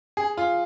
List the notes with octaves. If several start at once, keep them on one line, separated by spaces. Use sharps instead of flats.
G#4
F4